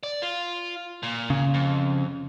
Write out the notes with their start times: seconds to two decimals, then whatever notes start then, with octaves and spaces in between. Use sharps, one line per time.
0.03 D5
0.22 F4
1.03 A#2
1.30 C#3
1.54 F2